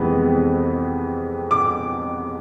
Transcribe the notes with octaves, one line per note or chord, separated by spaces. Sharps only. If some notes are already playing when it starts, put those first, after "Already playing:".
Already playing: F2 C3 E3 G#3 B3
D6